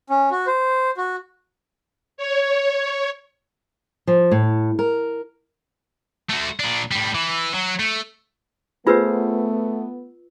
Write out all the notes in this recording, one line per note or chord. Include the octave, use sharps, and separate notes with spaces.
C#4
F#4
C5
F#4
C#5
F3
A2
A#4
A3 F#4
A#2 D4
A2 G3
E3
F#3
A3
A3 B3 F4 G#4 B4 C5 E6